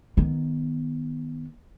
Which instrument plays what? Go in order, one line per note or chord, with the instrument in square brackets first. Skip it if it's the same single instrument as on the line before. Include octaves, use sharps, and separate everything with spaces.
[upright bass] D#3 B3